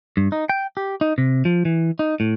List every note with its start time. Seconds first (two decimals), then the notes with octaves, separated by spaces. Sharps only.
0.17 G2
0.32 D#4
0.49 G5
0.77 G4
1.01 D#4
1.18 C3
1.45 F3
1.65 E3
1.99 D#4
2.20 A2